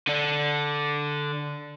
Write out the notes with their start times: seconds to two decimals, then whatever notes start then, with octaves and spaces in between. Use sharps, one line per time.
0.07 D3 D4